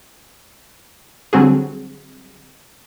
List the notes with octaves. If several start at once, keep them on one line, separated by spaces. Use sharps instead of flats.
D3 F#3 G3 C4 F#4 G#4